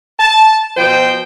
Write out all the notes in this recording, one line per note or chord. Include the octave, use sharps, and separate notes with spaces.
A5
B2 F3 C5 G5